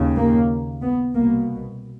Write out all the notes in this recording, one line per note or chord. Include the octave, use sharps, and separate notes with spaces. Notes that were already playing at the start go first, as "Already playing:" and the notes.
Already playing: D#2 C#3
A#3
B3
C2 B2 A#3